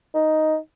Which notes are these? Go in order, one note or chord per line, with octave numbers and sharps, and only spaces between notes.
D#4